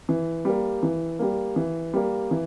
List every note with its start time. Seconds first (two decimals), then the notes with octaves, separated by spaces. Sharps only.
0.09 E3
0.45 G3 A#3
0.83 E3
1.19 G3 A#3
1.56 E3
1.93 G3 A#3
2.31 E3